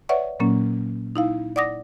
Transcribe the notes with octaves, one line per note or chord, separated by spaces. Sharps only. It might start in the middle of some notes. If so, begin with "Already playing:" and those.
B4 C#5 D5 E5 F#5 C#6
A#2 F#3 A#3 C#4
D#4 E4 F5
D5 F#5 D6 D#6 A#6